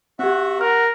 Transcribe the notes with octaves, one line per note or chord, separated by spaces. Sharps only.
C4 F#4 G4 E5 F#5
A#4 F#5 F6